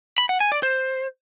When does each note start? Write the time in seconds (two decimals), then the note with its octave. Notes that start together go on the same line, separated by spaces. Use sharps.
0.18 B5
0.29 F#5
0.40 G#5
0.52 D5
0.63 C5